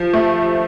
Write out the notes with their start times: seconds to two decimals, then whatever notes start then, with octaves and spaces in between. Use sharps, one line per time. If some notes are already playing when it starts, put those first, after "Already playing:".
Already playing: F3
0.13 A3